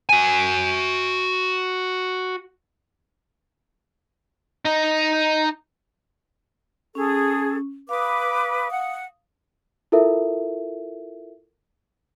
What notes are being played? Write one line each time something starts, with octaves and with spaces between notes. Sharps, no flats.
F#4 G#5
D#4 D#5
C#4 G#4 A4
B4 F5 D6 D#6
F#5
E4 F4 A4 A#4 E5